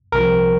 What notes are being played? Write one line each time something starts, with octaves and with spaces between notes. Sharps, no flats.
C2 C3 F3 A#4